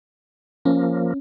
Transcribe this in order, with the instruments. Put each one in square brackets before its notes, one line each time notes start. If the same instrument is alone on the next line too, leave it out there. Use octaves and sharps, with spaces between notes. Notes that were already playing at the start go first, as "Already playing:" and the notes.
[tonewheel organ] F3 A#3 [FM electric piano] C#4